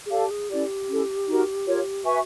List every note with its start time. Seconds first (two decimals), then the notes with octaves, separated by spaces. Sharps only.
0.06 G#4
0.10 G4 A4 D5 F5 A5
0.31 G#4
0.49 C#4 E4 G4 A4 D5
0.88 C#4 E4 A4
1.27 D#4 F#4 A#4
1.66 F4 A#4 C#5
2.05 F#4 B4 E5 G#5 C#6